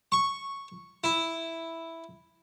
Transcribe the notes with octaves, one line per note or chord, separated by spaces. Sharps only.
C#6
E4